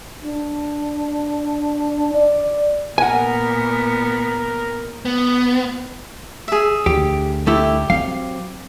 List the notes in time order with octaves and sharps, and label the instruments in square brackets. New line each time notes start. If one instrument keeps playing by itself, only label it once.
[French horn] D4
D5
[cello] A#2 B3 [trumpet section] A#4 [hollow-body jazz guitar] F#5 G#5
[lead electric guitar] B3
[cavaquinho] G#4 E5
[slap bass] D2 [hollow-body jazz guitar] G4
[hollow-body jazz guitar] A3 E4 [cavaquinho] G4
[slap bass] F#3 C4 [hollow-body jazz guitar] F5